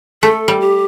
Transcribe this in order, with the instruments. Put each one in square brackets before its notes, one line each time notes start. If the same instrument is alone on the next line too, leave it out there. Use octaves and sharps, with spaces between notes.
[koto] A3 [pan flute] A4
[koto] G3
[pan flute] G4